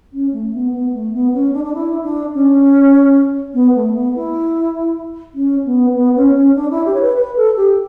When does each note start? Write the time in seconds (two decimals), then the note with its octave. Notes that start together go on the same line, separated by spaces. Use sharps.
0.13 C#4
0.32 A3
0.53 B3
0.72 B3
0.94 A3
1.13 B3
1.33 C#4
1.53 D4
1.64 D4
1.74 E4
2.03 D4
2.34 C#4
3.54 B3
3.75 A3
3.94 B3
4.15 E4
5.34 C#4
5.65 B3
5.95 B3
6.16 C#4
6.35 C#4
6.55 D4
6.71 E4
6.85 G4
6.94 C#5
7.01 B4
7.16 B4
7.36 A4
7.56 G4